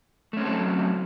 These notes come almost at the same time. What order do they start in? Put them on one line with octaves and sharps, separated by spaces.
A3 C#4 C4 A4 F#3